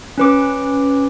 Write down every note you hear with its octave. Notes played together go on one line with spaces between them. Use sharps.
C#4 B4 D6